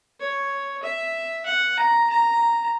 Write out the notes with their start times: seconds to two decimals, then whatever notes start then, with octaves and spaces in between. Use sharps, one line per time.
0.20 C#5
0.83 E5
1.46 F#5
1.77 A#5
2.09 A#5